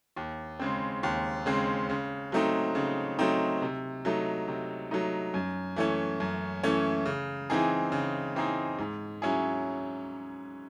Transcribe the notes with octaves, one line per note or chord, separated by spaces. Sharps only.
D#2
C#3 G#3 C4
D#2
C#3 G#3 C4
C#3
F#3 A3 C4 D#4
C#3
F#3 A3 C4 D#4
C3
F#3 A3 D#4
C3
F#3 A3 D#4
F#2
E3 A3 C#4
F#2
E3 A3 C#4
C#3
E3 C4 D#4 G#4
C#3
E3 C4 D#4 G#4
G#2
F#3 C#4 E4 G#4